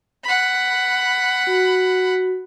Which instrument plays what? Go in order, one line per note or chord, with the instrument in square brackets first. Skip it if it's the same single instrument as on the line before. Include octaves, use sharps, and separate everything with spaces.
[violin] F#5 B5
[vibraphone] F#4